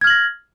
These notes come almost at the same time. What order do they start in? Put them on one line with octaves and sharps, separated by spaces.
G#6 F6 F#7 A#6